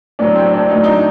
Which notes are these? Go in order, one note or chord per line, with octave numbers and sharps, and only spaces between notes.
A2 F#3 D4
C4
D4
A2 F#3 D#4
D#4